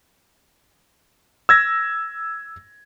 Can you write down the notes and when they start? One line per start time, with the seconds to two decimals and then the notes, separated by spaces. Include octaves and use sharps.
1.49 E6 G#6 A#6